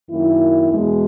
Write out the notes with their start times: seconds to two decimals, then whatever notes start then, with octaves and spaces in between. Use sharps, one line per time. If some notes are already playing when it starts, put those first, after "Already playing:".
0.10 F#2 D#3 A#3 E4
0.70 E2 B2 G#3